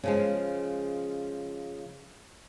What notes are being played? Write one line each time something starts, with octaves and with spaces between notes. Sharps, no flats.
C#3 F3 G#3